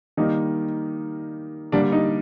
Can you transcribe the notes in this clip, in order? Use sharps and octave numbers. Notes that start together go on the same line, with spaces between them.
D#3 G3 A#3 D#4
D3 G3 A#3 D4
D#4